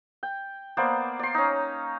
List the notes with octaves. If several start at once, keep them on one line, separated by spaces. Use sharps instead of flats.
G5
A#3 B3 C5 D5
D5 C6
C#4 D#4